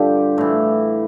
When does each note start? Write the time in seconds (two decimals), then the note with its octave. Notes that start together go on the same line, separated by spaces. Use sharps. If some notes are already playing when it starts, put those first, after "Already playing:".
Already playing: G2 D3 F3 G4
0.38 A2 E3